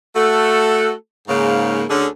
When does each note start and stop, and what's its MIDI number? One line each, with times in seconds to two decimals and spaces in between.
0.15 0.92 57
0.15 0.92 66
0.15 0.92 69
1.28 1.84 44
1.28 1.84 49
1.28 1.84 58
1.89 2.07 38
1.89 2.07 50
1.89 2.07 61
1.89 2.07 62
1.89 2.07 68
1.89 2.07 69